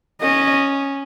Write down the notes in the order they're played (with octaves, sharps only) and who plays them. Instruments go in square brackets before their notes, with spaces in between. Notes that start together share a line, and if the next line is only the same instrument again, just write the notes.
[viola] C#4 [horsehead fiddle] D#5